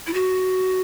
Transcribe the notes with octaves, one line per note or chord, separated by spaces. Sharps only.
E4
F#4